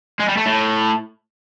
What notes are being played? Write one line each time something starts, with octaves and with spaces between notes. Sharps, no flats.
G#3
G3
A3
A2